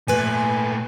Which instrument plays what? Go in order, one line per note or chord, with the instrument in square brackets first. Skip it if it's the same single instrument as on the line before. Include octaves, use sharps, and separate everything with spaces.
[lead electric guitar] A#2 A3 [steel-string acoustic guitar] B4 G#5